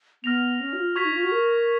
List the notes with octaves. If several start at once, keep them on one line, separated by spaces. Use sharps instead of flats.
B3 F6 A#6 F7
C#4
F#4
F4
F#4 C#6 G#6 B6 F7
D#4
F4
F#4
A#4